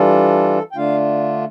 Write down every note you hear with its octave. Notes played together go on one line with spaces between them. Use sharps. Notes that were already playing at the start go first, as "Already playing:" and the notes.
Already playing: E3 G3 D4 F4 A4
G5
D3 A3 D4 F4 F5